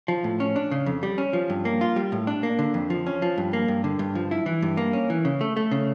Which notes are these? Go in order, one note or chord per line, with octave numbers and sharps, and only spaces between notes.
F3
A2
C#4
D4
C#3
F2
G3
C#4
F3
G2
A#3
F4
G3
A2
D4
A#3
D3
F2
F3
C#4
F3
G2
A#3
G2
D3
G2
F3
E4
E3
G2
A#3
C#4
E3
C#3
A3
A3
C#3